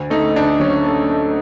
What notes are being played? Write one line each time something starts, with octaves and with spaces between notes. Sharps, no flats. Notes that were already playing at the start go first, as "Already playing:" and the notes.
Already playing: D2
A3 D#4
D2 D4
F#3 C#4
A3
A3